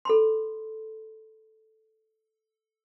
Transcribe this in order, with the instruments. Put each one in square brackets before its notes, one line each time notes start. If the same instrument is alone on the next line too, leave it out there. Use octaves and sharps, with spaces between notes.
[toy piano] A4 B5 C6